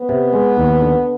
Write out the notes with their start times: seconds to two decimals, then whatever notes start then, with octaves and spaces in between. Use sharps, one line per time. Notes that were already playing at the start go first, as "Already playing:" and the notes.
Already playing: B3
0.09 C3
0.33 G#3
0.57 D#2
0.81 D3